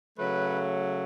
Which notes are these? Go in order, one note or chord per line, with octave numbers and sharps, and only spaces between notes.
C#3 F#3 A3 B4